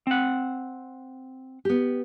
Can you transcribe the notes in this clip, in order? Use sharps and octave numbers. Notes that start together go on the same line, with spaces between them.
C4 F#5
B3 G4